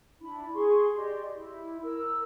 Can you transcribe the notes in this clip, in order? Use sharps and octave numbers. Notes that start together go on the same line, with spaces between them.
D4 E4 B5
G#4 C6 C#6
G4 D5 D#5 C6
E4
A#4 E6